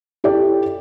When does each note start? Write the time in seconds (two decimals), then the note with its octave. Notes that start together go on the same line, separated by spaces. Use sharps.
0.24 E4 G4 A4 D5 G5